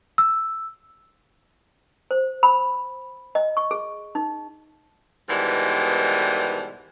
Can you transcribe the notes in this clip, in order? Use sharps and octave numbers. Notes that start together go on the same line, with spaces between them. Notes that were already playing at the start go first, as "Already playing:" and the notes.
E6
C5
B5
D#5
C#6
G#4
D#4
G#2 B2 D#3 E3 G3